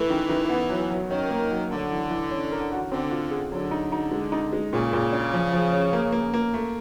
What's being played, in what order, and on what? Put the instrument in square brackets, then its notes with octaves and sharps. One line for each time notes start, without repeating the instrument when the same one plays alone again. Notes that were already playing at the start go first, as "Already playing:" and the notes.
Already playing: [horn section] E3 [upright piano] A3
[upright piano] D#3
D#3
B3
F#3
F#3
[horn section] D#3 [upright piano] C#4
[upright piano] A#3
F#3
[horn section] D3 [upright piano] A3
[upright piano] E3
E3
C#4
A#4
F#4
[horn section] D3 [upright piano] C4
[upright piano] F4
G#4
[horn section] D3 [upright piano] F#3
[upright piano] D#4
D#4
G#3
D#4
G#3
[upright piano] A#2 [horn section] C#3
[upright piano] A#2
D4
F3
F3
C#4
A#3
A#3
A#3
A3